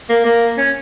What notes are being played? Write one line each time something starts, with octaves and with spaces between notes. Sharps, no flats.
A#3
A#3
C#4